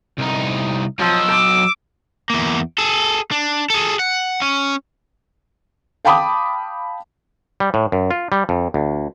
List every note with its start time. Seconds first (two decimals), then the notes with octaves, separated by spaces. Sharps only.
0.19 C2 D#4
0.99 F3 F#3 D#5 E6
1.31 D6
2.30 E2 A#3
2.78 G#4 A4
3.31 D4
3.70 G#4 A4
3.99 F#5
4.42 C#4
6.05 F5 G5 A5 B5 D6 D#6
7.60 G3
7.74 A2
7.92 F#2
8.11 F4
8.32 G3
8.49 F2
8.74 D2